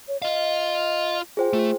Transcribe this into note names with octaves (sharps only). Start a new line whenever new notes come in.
C#5
F4 D#5 F5
F4 G#4 C5 G5
A3 F4